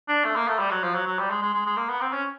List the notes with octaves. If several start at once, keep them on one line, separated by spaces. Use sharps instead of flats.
D4
A3
A#3
A3
G3
F#3
F3
F#3
F#3
G3
G#3
G#3
G#3
G#3
A#3
B3
C4
C#4